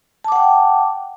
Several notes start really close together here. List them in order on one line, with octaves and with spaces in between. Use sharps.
A5 D6 F#5 G5